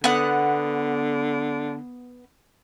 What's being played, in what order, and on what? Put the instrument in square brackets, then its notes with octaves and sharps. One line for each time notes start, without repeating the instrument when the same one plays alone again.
[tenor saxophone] D3 [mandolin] B3 F#5